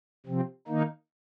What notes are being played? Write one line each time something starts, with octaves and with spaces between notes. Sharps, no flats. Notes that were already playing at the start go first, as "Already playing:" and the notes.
C3 F3 C4
D#3 A#3 D#4